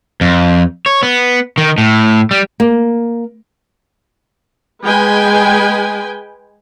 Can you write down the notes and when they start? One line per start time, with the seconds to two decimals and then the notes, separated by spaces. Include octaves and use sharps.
0.21 F2
0.86 C#5
1.03 B3
1.58 D#3
1.78 A2
2.31 G3
2.60 A#3
4.83 G#3 B4 G5 G#5